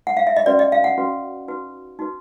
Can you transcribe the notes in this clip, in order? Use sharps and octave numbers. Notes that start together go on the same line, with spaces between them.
F#5
F5
E5
D#5
C#4 F#4 B4 D5
D#5
F5
F#5
C#4 F#4 B4
D#4 F#4 B4
D#4 F#4 B4